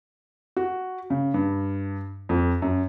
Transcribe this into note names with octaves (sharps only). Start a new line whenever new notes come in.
F#4
C#3
G2
F2
F#2